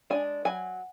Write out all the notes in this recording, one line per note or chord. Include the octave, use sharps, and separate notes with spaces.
G#3 D4 G#5
F#3 G#5